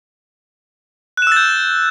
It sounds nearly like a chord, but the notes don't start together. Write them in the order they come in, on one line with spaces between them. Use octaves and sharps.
F#6 E7 E6 A6 G6